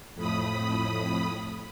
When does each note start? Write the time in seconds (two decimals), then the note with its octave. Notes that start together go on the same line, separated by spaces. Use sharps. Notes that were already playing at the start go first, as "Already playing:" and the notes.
0.15 F2 A2 B5 D#6